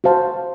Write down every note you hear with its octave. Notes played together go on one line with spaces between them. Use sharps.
F#4 C5 F5 A5